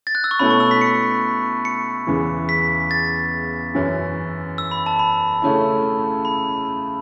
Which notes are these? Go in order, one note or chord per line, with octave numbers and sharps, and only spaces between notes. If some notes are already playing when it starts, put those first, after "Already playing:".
A6
F#6
E6
C#6
B2 A3 C#4 E4 B5
C#6
E6
B6
C#7
C#7
E2 C#3 E3
B6
A6
F#2 E3 C#4 E4
E6
B5
A5
B5
C#3 A3 C#4 E4
B5